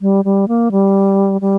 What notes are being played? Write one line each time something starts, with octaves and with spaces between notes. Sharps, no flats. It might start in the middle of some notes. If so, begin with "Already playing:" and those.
G3
G3
A#3
G3
G3